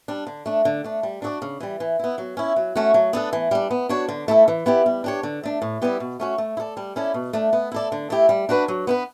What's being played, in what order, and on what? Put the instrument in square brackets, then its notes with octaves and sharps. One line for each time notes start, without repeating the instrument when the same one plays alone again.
[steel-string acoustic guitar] G3 D4
D3
A3 D4
D3
A3 D4
G3
D4 F#4 A4 D5
C#3
E3 G3
E3
B3 E4
F#3
C#4 E4
F#3
A3 C#4 F#4
F#3
B3 D4 A4
E3
G3 D4
B3
D4 F#4 C#5
D3
A3 E4 A4
E3
B3 E4 G4
G3
D4 G4 C#5
D3
A3 D4
A2
G3 B3 E4 G4
B2
A3 C#4 F#4
A3
E4
A4 D5
G3
C#4 E4 A4 D5
B2
A3 D4
B3
E4 A4 D5
D3
A3 E4 G4
G3
D4 F#4 B4
F#3
B3 E4 B4